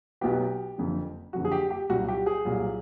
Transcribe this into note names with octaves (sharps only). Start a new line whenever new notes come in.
B1 B2 F#3 B3 G4
F#1 F2 D3
F#1 F2 D3 F#4
G#4
G4
G4
C2 A#2 F#3 F#4
G4
G#4
C2 A#2 F#3